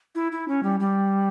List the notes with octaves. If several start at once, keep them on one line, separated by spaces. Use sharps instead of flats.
E4
E4
C#4
G3
G3